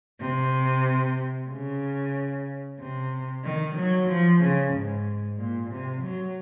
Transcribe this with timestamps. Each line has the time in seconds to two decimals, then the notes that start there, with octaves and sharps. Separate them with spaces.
0.21 C3
1.50 C#3
2.80 C3
3.44 D#3
3.76 F#3
4.09 F3
4.41 C#3
4.74 G#2
5.38 A#2
5.70 C3
6.03 F#3